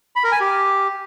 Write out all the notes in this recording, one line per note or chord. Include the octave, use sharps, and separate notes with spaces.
B5
A#4
G#5
G4